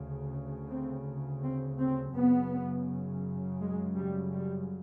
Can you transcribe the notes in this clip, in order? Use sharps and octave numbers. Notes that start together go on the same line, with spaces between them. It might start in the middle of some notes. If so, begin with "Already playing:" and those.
Already playing: D2 C#3
C4
C4
C4
F#2 C#3 B3
G#3
G3
G3